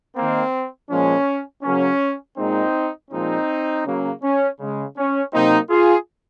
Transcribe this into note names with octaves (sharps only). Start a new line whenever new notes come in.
D#3 A#3 C4
A#2 F3 G#3 C#4
C#3 F#3 A#3 C#4
A#2 G#3 C4 D#4
A#2 F3 G#3 C4 D#4
C#3 F#3 A#3
C#4
C#3 G#3
C#4
C3 F#3 A#3 C4 D#4
F4 G#4